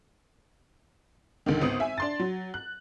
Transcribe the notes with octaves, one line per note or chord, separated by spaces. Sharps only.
C#2 D3 D#3
G#1 B3 D#6
E5 G#5
D4 C6 A6
F#3
F#6